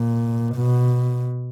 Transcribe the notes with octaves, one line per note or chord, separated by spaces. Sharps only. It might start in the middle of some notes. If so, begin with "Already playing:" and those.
Already playing: A#2
B2